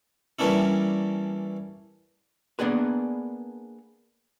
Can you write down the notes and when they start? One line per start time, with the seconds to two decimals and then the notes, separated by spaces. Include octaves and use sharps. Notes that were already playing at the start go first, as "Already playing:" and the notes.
0.39 E3 G3 A#3 C#4 D4 E4
2.59 A#3 B3 D4 G#4 B4